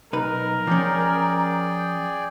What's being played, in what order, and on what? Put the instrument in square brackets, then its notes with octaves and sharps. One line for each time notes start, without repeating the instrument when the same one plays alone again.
[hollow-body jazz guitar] B1 D#4 B4 [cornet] A#4
[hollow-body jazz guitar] F3 C#4 [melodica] G#4 D5 G5